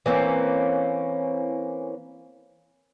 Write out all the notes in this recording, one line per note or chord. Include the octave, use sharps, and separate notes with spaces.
E3 A#3 C4 C#4